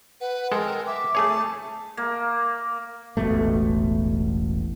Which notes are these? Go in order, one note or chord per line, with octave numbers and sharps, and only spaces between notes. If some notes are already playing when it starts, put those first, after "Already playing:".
B4 F#5
G#3 A4 A#4 G5
E5 D6
A3 G#4 C#5 A5
A#3
E1 A1 B2 A3